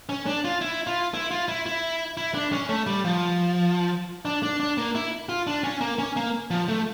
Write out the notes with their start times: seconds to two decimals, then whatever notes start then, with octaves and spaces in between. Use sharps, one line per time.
0.09 C#4
0.27 D4
0.44 F4
0.61 E4
0.87 F4
1.14 E4
1.31 F4
1.48 E4
1.66 E4
2.17 E4
2.35 D4
2.52 C#4
2.69 A3
2.87 G3
3.05 F3
4.25 D4
4.43 D4
4.60 D4
4.78 A#3
4.95 E4
5.29 F4
5.47 D4
5.64 C#4
5.81 A#3
5.99 C#4
6.16 A#3
6.51 F3
6.68 A3